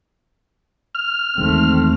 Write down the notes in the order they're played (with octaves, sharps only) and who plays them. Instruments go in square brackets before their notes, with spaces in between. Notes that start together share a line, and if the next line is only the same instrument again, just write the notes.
[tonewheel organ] F6
[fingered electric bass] E2 D#3 G#3 [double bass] A3 C4